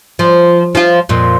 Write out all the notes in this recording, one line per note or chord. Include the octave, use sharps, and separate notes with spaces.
F3
F3 F4
F2 A#2